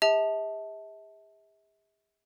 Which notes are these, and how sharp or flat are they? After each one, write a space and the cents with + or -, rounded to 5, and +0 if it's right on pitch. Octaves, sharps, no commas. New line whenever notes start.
G#4 -45 E5 -40 A5 +0